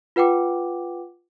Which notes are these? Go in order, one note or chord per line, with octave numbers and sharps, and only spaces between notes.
F4 B4 F#5 G5 D6